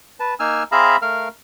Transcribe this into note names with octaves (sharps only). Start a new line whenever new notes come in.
B4 A5
A#3 D#4 G#5 E6 F6
C4 G#4 E5 F5 A#5 B5
A3 A#4 F5 F6